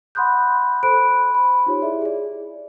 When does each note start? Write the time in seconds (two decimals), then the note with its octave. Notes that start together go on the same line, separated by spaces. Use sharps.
0.15 F#5 B5 C6 D#6 F#6 G6
0.83 A4 C5 B5 C6 F#6 D7
1.35 B5
1.66 D#4 F4 G4 C#5
1.82 E4 G#4 D5 E5
2.02 G#4 D5